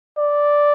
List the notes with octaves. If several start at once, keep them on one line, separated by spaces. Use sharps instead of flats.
D5